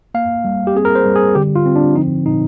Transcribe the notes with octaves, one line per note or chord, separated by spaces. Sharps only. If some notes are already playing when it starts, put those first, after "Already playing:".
A#3 F5
G3
G4
C4 G#4
A#4
C5
G3
G#4
D3 G4
F4
C4
D4
F3 D#4
A#2 D#4